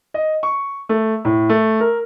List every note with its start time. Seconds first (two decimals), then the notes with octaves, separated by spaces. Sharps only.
0.14 D#5
0.43 C#6
0.89 A3
1.25 A2
1.49 A3
1.80 A#4